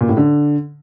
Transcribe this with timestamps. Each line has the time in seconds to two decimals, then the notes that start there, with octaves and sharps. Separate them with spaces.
0.01 A#2
0.09 A2
0.17 D3